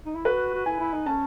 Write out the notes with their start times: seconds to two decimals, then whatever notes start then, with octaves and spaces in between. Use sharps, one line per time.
0.06 D#4
0.15 E4
0.25 F#4 B4
0.54 F#4
0.66 E4 G#5
0.79 E4
0.93 D#4
1.06 C#4 A5